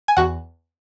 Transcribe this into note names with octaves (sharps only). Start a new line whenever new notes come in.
G#5
E2 F#4 F#5